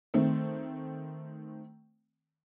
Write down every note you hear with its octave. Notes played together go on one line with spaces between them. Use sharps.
D#3 A3 C4